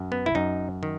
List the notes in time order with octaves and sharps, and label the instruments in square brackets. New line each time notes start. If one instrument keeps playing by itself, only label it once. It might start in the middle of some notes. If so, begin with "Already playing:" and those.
Already playing: [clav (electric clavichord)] F#2
B3
E4
F#2 D#4
D#3